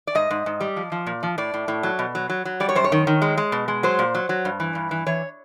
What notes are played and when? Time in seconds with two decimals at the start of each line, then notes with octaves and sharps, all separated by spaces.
0.07 D5
0.15 G#2 D#5
0.31 G#2
0.46 G#2
0.60 G3
0.76 F3
0.92 F3
1.07 A#2
1.23 F3
1.38 A2 D5
1.54 A2
1.68 A2
1.83 F#3
1.99 B2
2.15 F#3
2.30 F#3
2.45 F#3
2.60 G3 D5
2.69 C#5
2.75 F#2 C5
2.84 C#5
2.92 D#3
3.07 D#3
3.22 G#3
3.37 G#3
3.52 B2
3.68 G#3
3.83 F#3 C5
3.99 A#2
4.15 F#3
4.29 F#3
4.45 G2
4.60 E3
4.75 G2
4.91 E3
5.06 E3 C#5